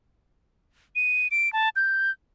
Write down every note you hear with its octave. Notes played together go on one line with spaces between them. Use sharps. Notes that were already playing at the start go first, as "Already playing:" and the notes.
D#7
D7
A5
G6